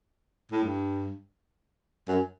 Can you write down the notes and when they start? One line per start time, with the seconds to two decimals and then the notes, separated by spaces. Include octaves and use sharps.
0.52 A2
0.63 G2
2.08 F#2